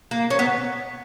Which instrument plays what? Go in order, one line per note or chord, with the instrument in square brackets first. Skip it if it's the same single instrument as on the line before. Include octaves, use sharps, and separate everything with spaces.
[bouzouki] A#3
C#4
B3